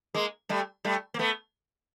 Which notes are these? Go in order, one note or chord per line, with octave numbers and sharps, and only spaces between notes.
G#3 A#3
G3 A3
G3 A3
A#3
A3 B3